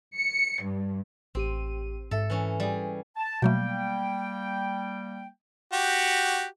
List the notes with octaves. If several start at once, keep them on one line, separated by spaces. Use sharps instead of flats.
C#7
G2
A1 C4 G4 D#7
G#2 A4 E5
E3 C#4
G3 G#4
A5
B2 F#3 G3 A3 A#3 G5
F#4 G4